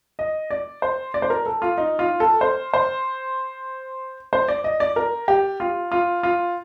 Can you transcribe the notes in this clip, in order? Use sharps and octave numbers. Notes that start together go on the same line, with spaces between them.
D#5
D5
C5
D5
C5
A#4
A4
F4
D#4
F4
A4
C5
C5
C5
D5
D#5
D5
A#4
G4
F4
F4
F4